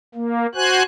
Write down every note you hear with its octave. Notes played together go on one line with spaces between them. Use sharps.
A#3
F#4 C5 G#5 F#6